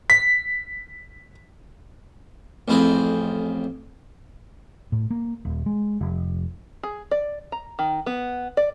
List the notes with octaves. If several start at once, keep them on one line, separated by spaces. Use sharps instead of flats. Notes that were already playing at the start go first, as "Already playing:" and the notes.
B6
A1 F2 C4 E4 G#4 G#5
A2
A#3
D#1
G#3
F1
G#4
D5
A#5
D#3
B3
D5